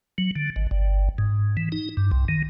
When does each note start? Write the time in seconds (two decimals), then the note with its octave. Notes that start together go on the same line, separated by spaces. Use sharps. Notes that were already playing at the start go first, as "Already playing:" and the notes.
0.18 F#3
0.36 D3
0.56 G#1
0.71 G1
1.18 G#2
1.57 E3
1.72 D#4
1.97 G2
2.12 C2
2.29 D#3